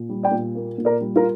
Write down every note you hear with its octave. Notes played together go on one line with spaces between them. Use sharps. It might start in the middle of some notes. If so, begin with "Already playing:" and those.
Already playing: A#2
G3
D5 G5
A#2
A#3
A#2
A#4 D5
G3
F4 A#4